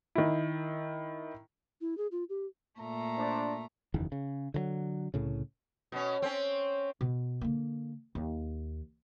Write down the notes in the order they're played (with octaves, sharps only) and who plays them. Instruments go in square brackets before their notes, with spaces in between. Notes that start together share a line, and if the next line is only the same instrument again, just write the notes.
[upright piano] D#3 E4
[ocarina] E4
G#4
F4
G4
[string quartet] A#2 A3 A#5
[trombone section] D4 C5
[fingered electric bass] F#1 E2 D#3
C#3
D3 D#3 F#3
C2 A2 C#3
[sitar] B2 C#4
C4 C#4
[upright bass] B2
D3 A#3
D#2